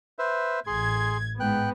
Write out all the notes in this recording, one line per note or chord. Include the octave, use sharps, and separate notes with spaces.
B4 C5 E5
A1 G#4 C6 G#6
G#2 B3 G5 F#6